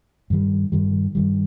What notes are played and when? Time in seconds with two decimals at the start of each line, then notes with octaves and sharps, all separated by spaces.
0.30 G2 D#3 G3
0.72 G2 D#3 G3
1.15 G2 D#3 G3